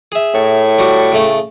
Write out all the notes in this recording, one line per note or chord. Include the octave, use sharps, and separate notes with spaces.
G#4 E5
A2 C#5
G3 F#4 G4
C#3 A3